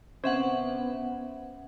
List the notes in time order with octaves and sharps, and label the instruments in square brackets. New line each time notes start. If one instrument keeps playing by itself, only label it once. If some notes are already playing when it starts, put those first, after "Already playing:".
[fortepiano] C3 [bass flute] B3 [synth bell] C#4 E5 F#5 [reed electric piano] C5